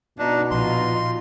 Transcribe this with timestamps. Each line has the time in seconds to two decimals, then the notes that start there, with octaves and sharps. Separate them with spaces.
0.18 B2 D4 D#4
0.51 A#2 F3 D#4 F4 C6